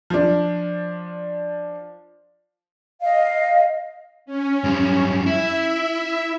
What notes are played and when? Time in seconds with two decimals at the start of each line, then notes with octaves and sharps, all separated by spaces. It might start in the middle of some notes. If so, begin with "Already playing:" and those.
0.10 F3 D4
3.02 D#5 F5
4.26 C#4
4.64 F#2 G3
5.26 E4 E5